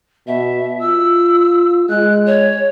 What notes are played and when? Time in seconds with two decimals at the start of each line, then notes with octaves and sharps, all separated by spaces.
0.27 B2 E5
0.79 F4 E6
1.89 G#3 F#6
2.26 C#5